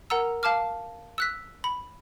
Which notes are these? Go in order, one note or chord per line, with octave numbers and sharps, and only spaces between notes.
A#4 F#5 A#5 E6
F5 A5 D6 F6
E6 F#6 B6
B5